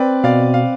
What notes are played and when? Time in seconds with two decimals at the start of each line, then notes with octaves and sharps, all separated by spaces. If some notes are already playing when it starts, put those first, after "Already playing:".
Already playing: C4 B4 D5
0.24 B2 D5 F5
0.54 F5